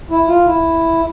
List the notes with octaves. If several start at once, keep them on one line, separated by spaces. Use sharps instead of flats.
E4
F4
E4